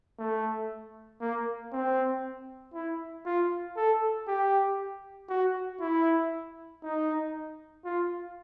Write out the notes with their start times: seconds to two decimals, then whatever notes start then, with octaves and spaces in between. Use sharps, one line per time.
0.19 A3
1.21 A#3
1.73 C4
2.74 E4
3.26 F4
3.77 A4
4.28 G4
5.29 F#4
5.80 E4
6.83 D#4
7.85 F4